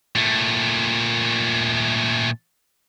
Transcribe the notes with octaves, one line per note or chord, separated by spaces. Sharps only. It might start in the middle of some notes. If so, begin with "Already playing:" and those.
A#2 A3